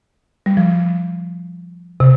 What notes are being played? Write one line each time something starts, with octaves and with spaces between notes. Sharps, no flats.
G3
F3
C3